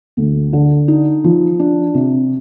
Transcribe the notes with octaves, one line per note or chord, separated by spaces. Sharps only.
D2
D3
D#4
F3
D4
C3